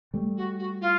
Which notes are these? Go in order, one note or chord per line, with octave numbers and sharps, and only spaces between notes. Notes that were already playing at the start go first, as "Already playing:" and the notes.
G3 A3
F#4
F#4
F4